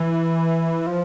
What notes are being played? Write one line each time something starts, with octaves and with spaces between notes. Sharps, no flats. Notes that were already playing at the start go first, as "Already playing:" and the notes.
Already playing: E3
F3